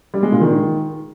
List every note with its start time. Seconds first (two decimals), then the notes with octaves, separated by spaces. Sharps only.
0.14 G3
0.23 G#3
0.32 A#2
0.41 D#3